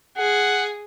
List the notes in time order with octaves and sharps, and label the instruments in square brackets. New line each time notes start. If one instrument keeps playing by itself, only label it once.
[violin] G#4 [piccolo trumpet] F#5